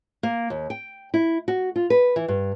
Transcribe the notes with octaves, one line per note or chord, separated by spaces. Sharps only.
A#3
D#2
G5
E4
F#4
F4
B4
E3
G2